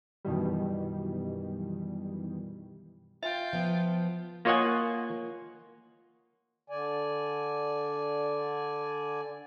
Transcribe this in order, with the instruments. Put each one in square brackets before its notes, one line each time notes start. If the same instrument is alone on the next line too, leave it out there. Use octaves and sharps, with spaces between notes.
[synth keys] F#2 B2 D#3 E3 G3
[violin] F4 G5 [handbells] E5
[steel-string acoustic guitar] F3 B3
[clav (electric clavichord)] A#3 F4 C#5 D#5 F#5 G#5
[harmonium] D3 D5 G#5